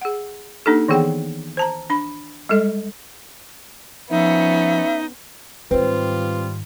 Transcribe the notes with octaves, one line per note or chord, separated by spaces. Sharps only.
G#4 F#5
A#3 D4 D#4 G4 A4
D#3 E3 B3 G#4 F#5 G5
C5 A5 A#5
D4 B5
G3 G#3 A4 D#5
F3 B3 C#4 D#4 E5
G#2 D#3 G3 C4 F4 B4